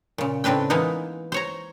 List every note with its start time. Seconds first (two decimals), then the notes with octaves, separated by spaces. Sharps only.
0.18 A#2 C#3
0.44 A2 C#3 C4 D4 B4 G5
0.70 E3 G#3 A#3 B3 D#4
1.32 C5 C#5 A#5